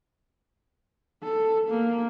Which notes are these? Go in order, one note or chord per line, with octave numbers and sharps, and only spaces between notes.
A4
A#3